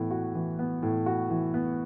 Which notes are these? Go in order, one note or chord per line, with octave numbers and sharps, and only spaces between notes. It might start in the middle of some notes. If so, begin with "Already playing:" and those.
Already playing: A2 E3 B3
F#4
E3
B3
A2
F#4
E3
B3